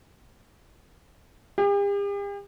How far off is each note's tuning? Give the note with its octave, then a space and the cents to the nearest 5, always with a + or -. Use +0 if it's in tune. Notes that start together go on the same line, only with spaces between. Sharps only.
G4 +45